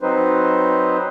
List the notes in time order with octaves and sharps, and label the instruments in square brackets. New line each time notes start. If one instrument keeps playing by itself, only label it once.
[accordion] F#3 C4 D#4 B4 C5